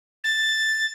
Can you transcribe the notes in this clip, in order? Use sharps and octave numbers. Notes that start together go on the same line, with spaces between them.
A6